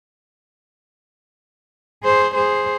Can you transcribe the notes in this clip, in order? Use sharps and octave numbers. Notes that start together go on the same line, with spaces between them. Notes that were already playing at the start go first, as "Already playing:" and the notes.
G#4 C5
G#4 C5